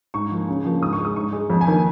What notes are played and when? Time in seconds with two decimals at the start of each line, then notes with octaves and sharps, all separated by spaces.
0.14 G#2 C#6
0.31 F3 A#3
0.48 C#3
0.65 F3 A#3
0.81 G#2 D#6
0.93 C#6
0.98 G#3
1.05 D#6
1.16 G#2 C#6
1.33 G#3
1.50 F2
1.61 G#5
1.68 D#3 A#3